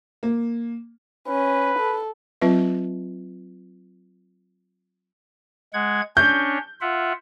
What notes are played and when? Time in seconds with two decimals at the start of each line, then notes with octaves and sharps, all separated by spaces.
0.23 A#3
1.28 C#4 B4
1.79 A4
2.41 F#3 C4 F4 B4 E5
5.73 G#3 F#5 G#6
6.17 C#4 D4 C#5 G6
6.81 F4 E5 F#5